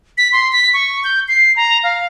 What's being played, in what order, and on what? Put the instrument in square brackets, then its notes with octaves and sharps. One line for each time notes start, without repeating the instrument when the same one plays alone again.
[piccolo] B6
C6
B6
C#6
G6
C7
A#5
F5